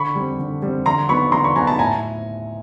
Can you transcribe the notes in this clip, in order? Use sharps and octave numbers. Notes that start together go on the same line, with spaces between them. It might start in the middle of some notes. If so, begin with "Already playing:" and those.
Already playing: D3 B5 C#6
G3 C4
D3
G3 C4
D3 A#5 C6
F#3 B3 D#4 B5 C#6
D3 A#5 C6
B5 C#6
F#3 B3 D#4 G#5 A#5
A5 B5
A2 G#5 A#5